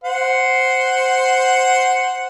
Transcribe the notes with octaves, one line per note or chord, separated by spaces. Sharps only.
C5 F#5